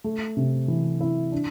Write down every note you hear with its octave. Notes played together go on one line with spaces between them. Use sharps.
A3
C3
E3
E4
D4